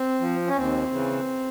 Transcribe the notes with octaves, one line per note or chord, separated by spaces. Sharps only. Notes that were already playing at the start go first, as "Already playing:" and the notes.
Already playing: C4
F3
C#4
D#2 C4
C#3 E3